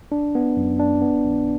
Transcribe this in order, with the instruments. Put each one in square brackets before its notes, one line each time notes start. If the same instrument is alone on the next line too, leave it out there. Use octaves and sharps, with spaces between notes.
[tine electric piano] D4
B3
F#2
D4
B3
A#1